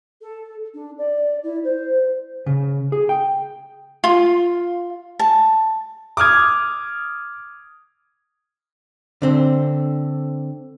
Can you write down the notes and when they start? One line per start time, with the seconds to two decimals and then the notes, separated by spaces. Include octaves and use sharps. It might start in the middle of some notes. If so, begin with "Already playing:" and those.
0.21 A4
0.74 D4
0.98 D5
1.43 E4
1.64 C5
2.46 C#3
2.92 G#4
3.09 G5
4.04 F4
5.19 A5
6.17 D6 D#6 F6 G#6
9.22 D3 C4